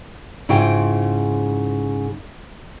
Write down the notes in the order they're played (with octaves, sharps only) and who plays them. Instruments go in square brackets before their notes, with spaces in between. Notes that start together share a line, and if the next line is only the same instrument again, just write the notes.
[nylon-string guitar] G#2 C#3 E4 F4 C5 G5